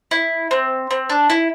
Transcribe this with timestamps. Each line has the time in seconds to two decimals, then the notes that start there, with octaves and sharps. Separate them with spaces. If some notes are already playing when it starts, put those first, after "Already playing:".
0.11 E4
0.51 C4
0.91 C4
1.10 D4
1.30 E4